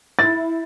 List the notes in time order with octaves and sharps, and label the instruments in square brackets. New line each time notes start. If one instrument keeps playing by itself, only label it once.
[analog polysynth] E4 [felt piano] A6